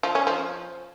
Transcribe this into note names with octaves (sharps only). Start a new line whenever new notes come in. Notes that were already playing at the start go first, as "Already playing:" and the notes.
F3
C#4
F3